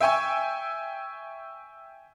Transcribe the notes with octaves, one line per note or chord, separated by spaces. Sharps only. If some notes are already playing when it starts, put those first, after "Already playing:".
E5 G5 G#5 C#6 E6